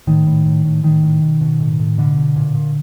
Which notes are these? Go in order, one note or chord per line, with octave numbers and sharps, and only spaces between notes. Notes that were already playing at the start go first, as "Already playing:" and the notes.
A2 D#3
A2
A2
A2
A2 D#3
A2
B2
B2
A2
A2
B2 D3
B2
A#2
A#2